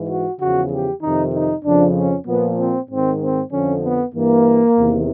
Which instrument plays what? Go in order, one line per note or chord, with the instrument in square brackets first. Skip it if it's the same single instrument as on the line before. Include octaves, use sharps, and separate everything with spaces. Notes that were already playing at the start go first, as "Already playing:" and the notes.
Already playing: [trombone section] G#2 E3
F#4
E2 C#3 F3 F#4
G4
F2 C3 D#3 D#4
D#4
F2 C#3 F3 D4
C#4
A#2 F3 B3
C4
G#2 D#3 C4
C4
F2 D3 F3 C#4
B3
G2 E3 A#3
E2 C3 D#3